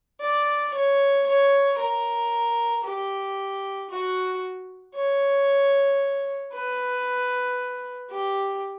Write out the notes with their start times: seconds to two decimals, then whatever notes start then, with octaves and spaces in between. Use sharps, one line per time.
0.21 D5
0.74 C#5
1.26 C#5
1.78 A#4
2.84 G4
3.90 F#4
4.94 C#5
6.52 B4
8.10 G4